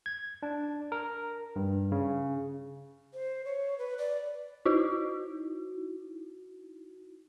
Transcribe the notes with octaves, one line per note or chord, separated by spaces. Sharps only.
G#6
D4
A#4
G2
C#3
C5
C#5
B4
D5
D#4 E4 F#4